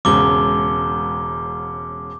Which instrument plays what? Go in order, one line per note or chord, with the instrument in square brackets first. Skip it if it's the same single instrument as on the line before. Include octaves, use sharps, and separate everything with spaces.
[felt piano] E1 G#2 C#3 [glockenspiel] D6 G7